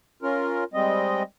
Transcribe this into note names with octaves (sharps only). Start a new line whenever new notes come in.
C#4 F4 A#4
G3 G#3 C4 D#5